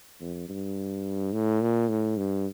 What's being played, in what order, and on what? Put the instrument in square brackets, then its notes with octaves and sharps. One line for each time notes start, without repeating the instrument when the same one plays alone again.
[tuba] F2
G2
A2
A#2
A2
G2